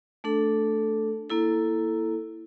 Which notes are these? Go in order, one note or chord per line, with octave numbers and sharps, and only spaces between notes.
A3 D4 A4
A#3 E4 A4